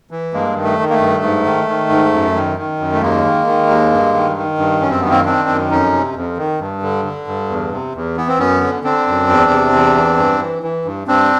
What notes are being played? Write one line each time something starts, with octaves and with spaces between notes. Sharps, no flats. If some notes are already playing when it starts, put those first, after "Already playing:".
E3
G2 G#3 A#3
D#3
A3
D#3
A#3
A3
G2
G#2
D#3
D#3
G#2
F#2
D#3
D#3
F#2
A3
D#2 G#3 A#3
D#3
D#3
D#2
G2
D#3
D#3
G2
F#2 C#4
C4
D#3 B3
A#3 C4
D#3 C4 D4
F#2
F2 C#4 D#4
C3
F2
D#3
G2
D3
D3
G2
E2
C3
E2
E3 B3
C4
F#2 B3 C#4
D3
D3 C4 D4
F#2
E2
C3
E2
E3
G2
E3
E3
G2
G2 C4 D4